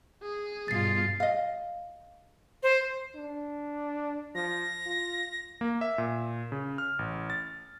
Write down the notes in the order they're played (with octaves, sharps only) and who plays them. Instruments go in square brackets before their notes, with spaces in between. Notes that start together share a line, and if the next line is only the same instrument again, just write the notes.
[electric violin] G#4
[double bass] G2 [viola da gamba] B2 F4 [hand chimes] A6 C7
[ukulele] D#5 F5
[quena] C5
[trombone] D4
[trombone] F3 [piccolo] A#6
[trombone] F4
[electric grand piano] A#3
E5
A#2
C#3
F6
A1
A6